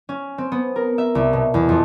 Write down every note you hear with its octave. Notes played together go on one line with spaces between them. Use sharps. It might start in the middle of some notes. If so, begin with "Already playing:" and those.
C#4
C4
B3
A#4
E5
C2
B2
E2
F2